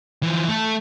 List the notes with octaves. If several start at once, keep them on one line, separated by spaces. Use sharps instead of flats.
E3 F3
A3 A4